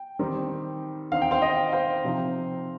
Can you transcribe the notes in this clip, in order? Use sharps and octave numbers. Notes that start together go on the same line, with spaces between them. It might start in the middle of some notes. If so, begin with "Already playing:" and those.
Already playing: G5
D#3 G3 C4 D#4
D#3 C4 D#4 F5
G5
C5 F5
D#5 G5
C5 F5
C3 F3 C4 D#4